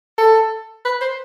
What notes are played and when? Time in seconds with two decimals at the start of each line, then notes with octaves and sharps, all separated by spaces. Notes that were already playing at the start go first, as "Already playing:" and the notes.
0.18 A4
0.85 B4
1.01 C5